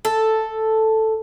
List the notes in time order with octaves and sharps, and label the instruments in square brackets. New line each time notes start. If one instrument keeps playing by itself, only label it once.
[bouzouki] A4